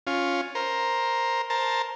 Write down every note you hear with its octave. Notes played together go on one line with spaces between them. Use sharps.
C#4 F4
A#4 C5
A#4 C5 A5